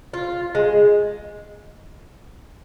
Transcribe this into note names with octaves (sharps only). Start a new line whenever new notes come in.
F4
G#3